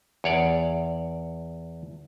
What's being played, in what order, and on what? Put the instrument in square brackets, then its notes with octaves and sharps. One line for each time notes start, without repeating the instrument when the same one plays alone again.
[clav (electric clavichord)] E2 C#5 D5